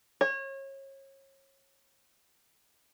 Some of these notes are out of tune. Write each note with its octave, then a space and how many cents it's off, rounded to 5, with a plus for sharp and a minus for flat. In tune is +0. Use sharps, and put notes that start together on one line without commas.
C#5 -30